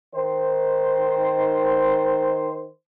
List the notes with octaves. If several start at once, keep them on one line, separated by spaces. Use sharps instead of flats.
D#3 C5